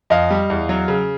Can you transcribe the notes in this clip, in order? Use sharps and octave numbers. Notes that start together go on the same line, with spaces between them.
F2 D#5 F5
G3
E2
F#3
C#3